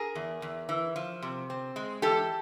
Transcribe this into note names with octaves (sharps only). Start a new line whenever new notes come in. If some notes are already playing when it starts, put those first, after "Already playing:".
Already playing: G#4 A#4
E2
E2
E3
F3
C3
C4
G#3
E3 G4 A4